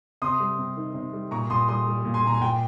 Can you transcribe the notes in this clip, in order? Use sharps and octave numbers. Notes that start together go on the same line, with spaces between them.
C3 C6 D#6
G3
C3
D#3
C3
G3
A#2 A#5 C#6
A#2 C6 D#6
G3 C6 D#6
G3
A#2
G#5 C6
A#2 A#5
G#5
A#2 G5